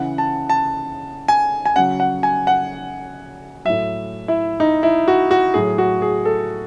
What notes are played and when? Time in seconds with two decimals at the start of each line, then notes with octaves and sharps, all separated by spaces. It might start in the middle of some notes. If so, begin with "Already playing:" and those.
Already playing: C#3 E3 F#5
0.18 A5
0.49 A5
1.28 G#5
1.65 G#5
1.76 C#3 F#3 F#5
2.00 F#5
2.23 G#5
2.47 F#5
3.65 A2 F#3 E5
4.28 E4
4.60 D#4
4.83 E4
5.08 F#4
5.31 F#4
5.54 A2 F#3 G#4
5.78 F#4
6.02 G#4
6.25 A4